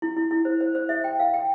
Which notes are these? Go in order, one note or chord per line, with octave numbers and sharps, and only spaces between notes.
E4
E4
E4
C5
C5
C5
E5
G5
F5
G5